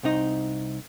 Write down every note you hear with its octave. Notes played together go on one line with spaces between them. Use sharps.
C2 C4 D#4 D#5